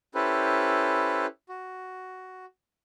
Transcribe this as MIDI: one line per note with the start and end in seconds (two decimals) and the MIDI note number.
0.15 1.26 61
0.15 1.26 64
0.15 1.26 67
0.15 1.26 69
0.15 1.26 71
0.15 1.26 72
1.49 2.45 66